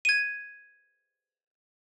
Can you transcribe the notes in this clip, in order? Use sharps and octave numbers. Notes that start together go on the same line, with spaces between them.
G#6 D#7